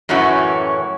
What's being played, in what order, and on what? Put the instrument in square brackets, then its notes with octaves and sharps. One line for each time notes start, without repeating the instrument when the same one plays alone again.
[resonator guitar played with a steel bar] F#2 A2 E3 C#4 F#4